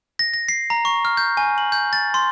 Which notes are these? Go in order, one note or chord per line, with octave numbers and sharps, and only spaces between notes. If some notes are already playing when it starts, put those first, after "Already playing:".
A#6
A#6
C7
A#5
C#6
F6
G6
G#5
F#7
G6
A6
C6